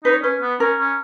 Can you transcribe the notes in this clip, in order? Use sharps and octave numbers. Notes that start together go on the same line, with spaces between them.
D#4 B4
C#5
C#4 B4
B3
C#4 A#4
C#4